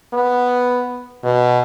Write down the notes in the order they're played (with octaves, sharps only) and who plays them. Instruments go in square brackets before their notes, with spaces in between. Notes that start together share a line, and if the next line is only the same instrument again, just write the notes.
[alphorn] B3
B2